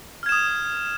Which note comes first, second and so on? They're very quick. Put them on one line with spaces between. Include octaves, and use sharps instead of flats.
F6 G#6 E7 D#6